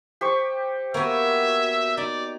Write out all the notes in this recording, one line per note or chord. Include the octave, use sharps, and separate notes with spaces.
G4 C5 C#6
A#3 B3 F#4 C#5 E5
D#4 D5